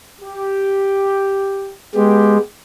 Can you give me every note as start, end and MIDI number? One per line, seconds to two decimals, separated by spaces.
0.21 1.72 67
1.95 2.38 56
1.95 2.39 59
1.95 2.39 67